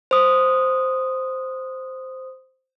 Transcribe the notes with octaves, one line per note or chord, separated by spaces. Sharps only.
C5 D#6